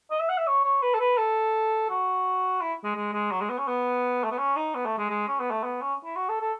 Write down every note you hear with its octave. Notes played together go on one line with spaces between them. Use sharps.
D#5
E5
F#5
E5
C#5
C#5
B4
A4
B4
A4
F#4
E4
G#3
G#3
G#3
F#3
G#3
B3
C#4
B3
A3
B3
C#4
D#4
B3
A3
G#3
G#3
C#4
B3
A3
B3
C#4
E4
F#4
A4
A4